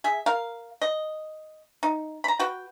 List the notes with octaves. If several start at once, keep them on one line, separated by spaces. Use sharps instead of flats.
G#4 E5
A#4 F5
D#5
D#4
A#5 B5
F#4 B4 G5